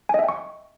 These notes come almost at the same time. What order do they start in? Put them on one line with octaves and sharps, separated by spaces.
G#5 D#5 E5 G5 C#6